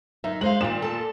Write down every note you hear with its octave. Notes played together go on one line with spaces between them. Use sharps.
F#2 D#4 E5
G#3 C5 F5 F#7
A#2 D#3 G3 E7
A4 A5